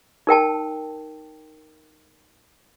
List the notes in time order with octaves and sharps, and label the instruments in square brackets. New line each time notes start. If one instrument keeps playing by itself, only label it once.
[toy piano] D#4 A#4 G5 A5